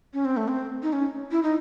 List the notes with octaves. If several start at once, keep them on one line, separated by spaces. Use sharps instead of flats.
C#4
C4
A3
C4
D#4
C#4
E4
D#4